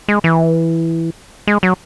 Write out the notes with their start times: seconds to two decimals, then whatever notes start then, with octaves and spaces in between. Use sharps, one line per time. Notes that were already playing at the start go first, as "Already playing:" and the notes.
0.08 G#3
0.24 E3
1.47 G#3
1.63 F#3